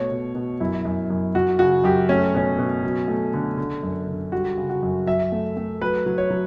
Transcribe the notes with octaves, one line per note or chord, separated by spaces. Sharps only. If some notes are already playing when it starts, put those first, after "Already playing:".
Already playing: B2 A3 C#5
B2
B2
F#2 E4
F#2
F#2
F#2 F#4
C#3 F#4
F#2 G4
A3 C#4
B2 C#4
B2
F#3
A3
D3
D3
F#2
D3
G3 F#4
C#3
F#4
F#2
F#3 E5
A3
A3
F#3 B4
F#3
C#5
F#3